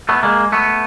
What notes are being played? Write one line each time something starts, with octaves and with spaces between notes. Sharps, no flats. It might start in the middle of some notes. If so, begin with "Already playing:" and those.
A3 B3
G#3 A#3
A3 B3